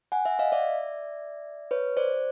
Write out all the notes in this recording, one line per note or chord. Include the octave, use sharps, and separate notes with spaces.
F#5 G#5
E5 F#5
D#5 F5
D5 E5
B4 C#5
C5 D5